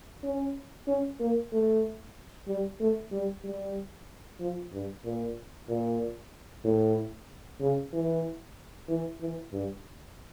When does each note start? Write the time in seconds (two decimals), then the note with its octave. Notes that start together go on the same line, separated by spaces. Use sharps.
0.23 C#4
0.87 C#4
1.20 A#3
1.52 A3
2.48 G3
2.80 A3
3.12 G3
3.44 G3
4.40 F3
4.72 G2
5.04 A#2
5.69 A#2
6.65 A2
7.61 C#3
7.93 E3
8.88 E3
9.21 E3
9.52 G2